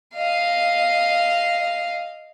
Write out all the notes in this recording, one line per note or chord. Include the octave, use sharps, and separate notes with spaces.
D#5 F5